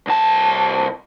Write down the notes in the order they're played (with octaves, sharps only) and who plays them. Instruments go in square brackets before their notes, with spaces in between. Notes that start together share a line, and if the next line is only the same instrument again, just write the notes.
[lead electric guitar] C2 A5